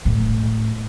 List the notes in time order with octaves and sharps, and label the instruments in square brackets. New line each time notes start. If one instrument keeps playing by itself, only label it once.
[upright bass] A2